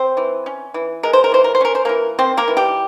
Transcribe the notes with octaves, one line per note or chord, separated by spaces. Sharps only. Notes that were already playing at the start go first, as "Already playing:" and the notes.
Already playing: C4 C5
E3
C#4
E3
G#3 A#4
C5
A#4
E3 C5
A#4
C5
C#4 A#4
C5
E3 A#3 A#4
A#3 C4 C5
A#3 A#4
E3
G3 G4